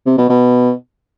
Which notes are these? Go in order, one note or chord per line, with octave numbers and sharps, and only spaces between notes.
C3
B2
B2